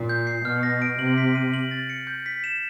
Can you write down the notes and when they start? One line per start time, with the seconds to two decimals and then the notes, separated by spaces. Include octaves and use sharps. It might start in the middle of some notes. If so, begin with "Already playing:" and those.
Already playing: A#2
0.09 G6
0.27 C7
0.45 B2 F6
0.63 A#6
0.82 D7
0.99 C3 F#7
1.18 B6
1.35 D#7
1.53 F#7
1.71 A6
1.90 C#7
2.07 G6
2.26 B6
2.44 E7